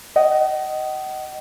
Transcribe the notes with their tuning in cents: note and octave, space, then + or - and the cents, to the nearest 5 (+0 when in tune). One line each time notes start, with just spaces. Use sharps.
D#5 +0 F#5 +45